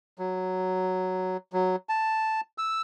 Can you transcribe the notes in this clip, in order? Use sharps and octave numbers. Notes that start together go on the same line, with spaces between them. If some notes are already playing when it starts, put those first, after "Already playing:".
F#3
F#3
A5
E6